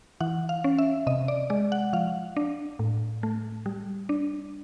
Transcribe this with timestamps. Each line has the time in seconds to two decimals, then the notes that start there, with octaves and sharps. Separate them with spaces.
0.20 E3 F#5
0.49 F5
0.64 C#4
0.78 E5
1.07 C3 D#5
1.28 D5
1.50 G#3 D5
1.72 F#5
1.93 F3 F5
2.37 D4
2.79 A2
3.23 A3
3.66 G3
4.09 D4